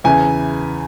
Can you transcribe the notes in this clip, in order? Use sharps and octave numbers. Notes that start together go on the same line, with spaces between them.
E2 C#3 E3 G#5